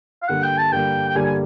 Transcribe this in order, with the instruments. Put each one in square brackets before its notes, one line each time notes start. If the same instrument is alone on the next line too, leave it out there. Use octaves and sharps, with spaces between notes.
[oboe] F5
[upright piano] G2 D3 G3 A#3 [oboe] F#5
[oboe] G5
A5
[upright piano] G2 D3 G3 A#3 [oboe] G5
[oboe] G5
[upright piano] G2 D3 G3 A#3 [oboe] G#5
[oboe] G#5